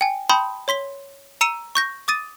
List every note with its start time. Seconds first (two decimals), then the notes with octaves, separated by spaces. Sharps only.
0.01 G5 G#5
0.30 G5 A5 B5 C6 D#6 G6
0.68 C#5 C6 B6 G7
1.41 A#5 E6 C#7 D#7 E7
1.75 C#6 G6 A#6
2.08 D6 D#6 A6 D#7